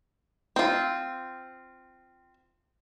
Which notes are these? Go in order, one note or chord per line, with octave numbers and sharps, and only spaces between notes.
C4 F4